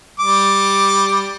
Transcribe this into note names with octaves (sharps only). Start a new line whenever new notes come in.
G3 D6